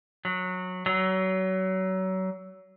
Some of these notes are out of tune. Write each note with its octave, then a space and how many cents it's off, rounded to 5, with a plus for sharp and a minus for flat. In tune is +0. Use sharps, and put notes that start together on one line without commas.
F#3 -15
F#3 +30